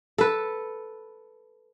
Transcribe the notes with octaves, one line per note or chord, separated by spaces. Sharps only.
A4 B4